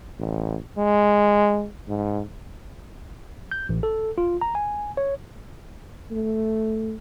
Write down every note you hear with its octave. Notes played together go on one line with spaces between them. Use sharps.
A1
G#3
G#2
G6
A1
A4
F4
A#5
G#5
C#5
A3